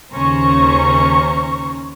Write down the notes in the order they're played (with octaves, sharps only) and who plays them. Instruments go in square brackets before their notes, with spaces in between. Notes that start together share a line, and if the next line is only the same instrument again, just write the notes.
[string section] D#2 C#3 C#4 C5 A#5 C#6